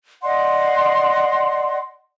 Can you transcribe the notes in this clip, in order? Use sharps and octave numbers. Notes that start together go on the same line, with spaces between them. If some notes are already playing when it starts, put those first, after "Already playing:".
D5 D#5 F#5 C6